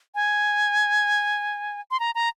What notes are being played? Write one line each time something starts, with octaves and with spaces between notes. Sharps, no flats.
G#5
C6
A#5
A#5